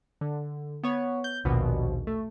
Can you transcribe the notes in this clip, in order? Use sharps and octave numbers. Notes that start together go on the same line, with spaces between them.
D3
B3 C#5
G6
A#1 D#2 B2
A3